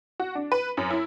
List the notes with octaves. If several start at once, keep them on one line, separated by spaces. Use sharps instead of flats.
F#4
D4
B4
F#2
E4